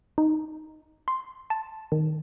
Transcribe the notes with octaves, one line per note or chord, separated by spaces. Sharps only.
D#4
C6
A5
D#3